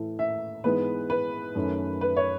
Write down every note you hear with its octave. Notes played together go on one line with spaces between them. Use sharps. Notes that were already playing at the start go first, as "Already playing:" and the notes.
Already playing: A2 E3 A3
E5
G#2 E3 G#3 B3 B4
B4
F#2 D#3 A3 C#4
B4
C#5